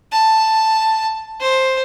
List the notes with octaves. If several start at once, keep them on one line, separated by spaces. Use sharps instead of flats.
A5
C5